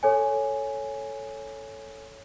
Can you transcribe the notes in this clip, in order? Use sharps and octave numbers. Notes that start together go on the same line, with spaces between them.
A4 C#5 G#5